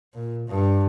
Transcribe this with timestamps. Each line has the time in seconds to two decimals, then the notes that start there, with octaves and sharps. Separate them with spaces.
0.14 A#2
0.48 G2